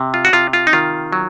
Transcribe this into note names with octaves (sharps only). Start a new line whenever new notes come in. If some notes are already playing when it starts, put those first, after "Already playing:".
Already playing: C3
F4
F#4
C3 F4
F4
D#4
D#3 F4
F#3